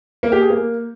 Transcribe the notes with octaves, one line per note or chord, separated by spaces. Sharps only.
A#3
G4
G#4
A#3